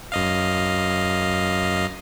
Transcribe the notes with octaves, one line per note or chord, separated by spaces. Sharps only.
F#2 D#5 F5